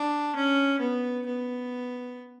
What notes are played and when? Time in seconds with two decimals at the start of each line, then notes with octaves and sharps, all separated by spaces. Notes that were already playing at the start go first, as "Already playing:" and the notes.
Already playing: D4
0.36 C#4
0.80 B3
1.26 B3